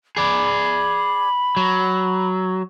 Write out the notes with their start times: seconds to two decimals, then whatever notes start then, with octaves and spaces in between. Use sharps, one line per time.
0.17 G#4 D5 B5
1.57 F#3